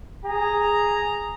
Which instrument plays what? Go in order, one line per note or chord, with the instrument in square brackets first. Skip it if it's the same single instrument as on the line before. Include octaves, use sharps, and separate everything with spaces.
[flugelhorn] G#4 [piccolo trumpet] A#5